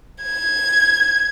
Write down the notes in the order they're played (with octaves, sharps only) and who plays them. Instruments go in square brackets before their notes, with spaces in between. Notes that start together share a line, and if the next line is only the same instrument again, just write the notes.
[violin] G#6